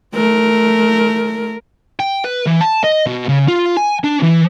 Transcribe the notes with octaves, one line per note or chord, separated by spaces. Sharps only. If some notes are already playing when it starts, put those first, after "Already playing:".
A3 A#4
G5
B4
E3
A5
D#5
B2
C#3
F4
G#5
D4
E3